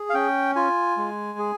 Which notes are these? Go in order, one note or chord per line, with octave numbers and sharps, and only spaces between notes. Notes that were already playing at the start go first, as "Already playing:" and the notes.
Already playing: G#4
F5
C#4 G5
F4 G#5
G#3
G#4